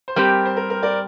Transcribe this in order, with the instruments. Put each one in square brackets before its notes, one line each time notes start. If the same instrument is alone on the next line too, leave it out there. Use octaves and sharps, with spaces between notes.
[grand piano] C5
[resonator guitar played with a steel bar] G3 C4 G4 [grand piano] A#4
[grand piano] C5
A#4
A#4
A#4 D5